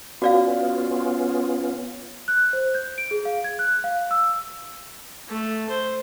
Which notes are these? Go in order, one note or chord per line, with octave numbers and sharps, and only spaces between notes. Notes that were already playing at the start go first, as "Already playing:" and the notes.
B3 C#4 F4 F#4 D5 F5
F#6
C5
G6
D7
G#4
F5
G#6
F#6
F5
E6
A3
C5